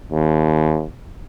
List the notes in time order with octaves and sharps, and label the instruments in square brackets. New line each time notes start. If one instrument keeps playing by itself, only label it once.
[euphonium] D#2